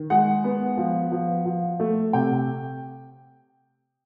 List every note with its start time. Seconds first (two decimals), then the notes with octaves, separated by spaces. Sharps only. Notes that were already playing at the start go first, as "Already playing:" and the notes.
Already playing: D#3
0.10 G#3 F#5
0.44 B3
0.77 F3
1.12 F3
1.46 F3
1.80 A3
2.13 C3 G5